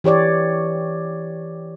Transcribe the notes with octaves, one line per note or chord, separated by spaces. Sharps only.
E3 G4 C#5 D5